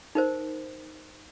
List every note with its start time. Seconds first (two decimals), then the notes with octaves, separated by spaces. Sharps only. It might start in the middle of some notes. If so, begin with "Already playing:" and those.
0.15 D#4 A#4 C5